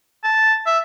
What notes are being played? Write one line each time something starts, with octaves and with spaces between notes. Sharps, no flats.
A5
E5